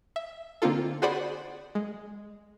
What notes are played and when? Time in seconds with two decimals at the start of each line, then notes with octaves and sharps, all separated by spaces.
0.16 E5
0.62 D3 A#3 C4 D#4 F4 A4
1.02 F#4 G#4 C5 D5 F#5 B5
1.75 G#3